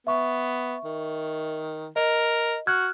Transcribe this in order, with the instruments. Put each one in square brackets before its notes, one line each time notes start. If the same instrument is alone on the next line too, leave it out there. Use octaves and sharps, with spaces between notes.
[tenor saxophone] B3 [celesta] E5 C#6
[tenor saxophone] D#3
[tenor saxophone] A#4 [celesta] D#5
[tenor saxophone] F#4 [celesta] F6 F#6 G#6